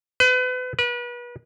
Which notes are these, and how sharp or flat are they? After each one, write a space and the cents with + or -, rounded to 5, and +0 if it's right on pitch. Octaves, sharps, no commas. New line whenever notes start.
B4 +35
B4 -35